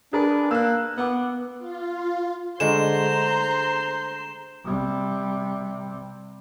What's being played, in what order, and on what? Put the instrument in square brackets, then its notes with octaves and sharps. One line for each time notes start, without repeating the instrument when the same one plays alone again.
[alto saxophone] D4 [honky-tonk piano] G#4 A#4 B4
[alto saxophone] A#3 [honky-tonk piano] E6 F#6
[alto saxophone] B3 [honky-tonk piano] F#5 D6
[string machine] F4
[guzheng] D3 G#3 A3 [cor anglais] C5 [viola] A#5 C6 [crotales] E7
[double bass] C3 G3